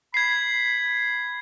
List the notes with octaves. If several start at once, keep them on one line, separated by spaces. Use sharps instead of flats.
B5 G#6 C7